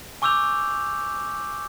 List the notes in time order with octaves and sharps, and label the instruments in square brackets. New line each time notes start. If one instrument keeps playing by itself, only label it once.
[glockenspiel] G#5 C#6 D6 E6 G6 F7